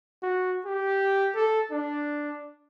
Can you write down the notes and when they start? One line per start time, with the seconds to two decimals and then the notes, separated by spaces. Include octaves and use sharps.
0.23 F#4
0.65 G4
1.35 A4
1.71 D4